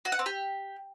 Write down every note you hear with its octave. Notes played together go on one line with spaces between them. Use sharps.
F#4
F#5
C4
G4